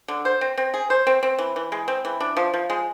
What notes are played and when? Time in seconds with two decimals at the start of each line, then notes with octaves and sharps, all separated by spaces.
0.08 D3
0.25 C5
0.41 C4
0.57 C4
0.74 G#4
0.90 C5
1.07 C4
1.23 C4
1.39 E3
1.56 E3
1.72 G#3
1.88 C4
2.05 E3
2.20 D4
2.37 F3
2.54 F3
2.70 G#3